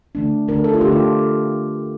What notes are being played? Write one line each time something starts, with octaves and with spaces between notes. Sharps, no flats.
D3 A3 D4
D3 A3 D4 A#4
A4
F4
D3 A3 D4 G4
F4